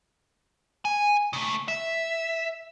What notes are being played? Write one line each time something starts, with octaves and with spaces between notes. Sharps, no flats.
G#5
C#3 A3
E5